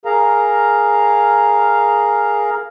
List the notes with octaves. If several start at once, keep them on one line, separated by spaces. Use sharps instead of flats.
G#4 A#4 F5 A#5